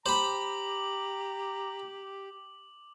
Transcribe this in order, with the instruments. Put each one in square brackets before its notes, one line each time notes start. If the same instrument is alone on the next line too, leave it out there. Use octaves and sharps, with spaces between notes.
[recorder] G4 [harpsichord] C5 B5 [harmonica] A#5 [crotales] D6 F#7